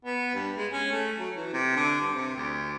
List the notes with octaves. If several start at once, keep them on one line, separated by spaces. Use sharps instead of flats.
B3
G2
G#3
C#4
A3
F#3
E3
C3
D3
G2
C3
D2